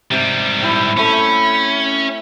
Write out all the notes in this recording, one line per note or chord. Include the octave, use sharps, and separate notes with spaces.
G#2 C3 G3
E4 G5
A3 C#4 B5